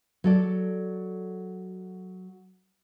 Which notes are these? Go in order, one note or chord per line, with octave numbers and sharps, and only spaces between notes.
F#3 A4 D5